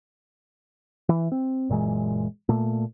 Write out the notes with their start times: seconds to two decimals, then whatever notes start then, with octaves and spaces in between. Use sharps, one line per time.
1.09 E3
1.32 C4
1.69 F#1 A#2 E3 G#3
2.49 A#2 A3